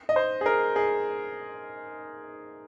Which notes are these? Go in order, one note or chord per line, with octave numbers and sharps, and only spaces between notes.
D#5
C5
G#4
A#4
G#4